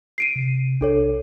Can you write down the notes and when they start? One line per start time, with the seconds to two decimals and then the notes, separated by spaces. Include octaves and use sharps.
0.18 C7 D7 D#7
0.36 C3
0.81 B1 D4 A4 C#5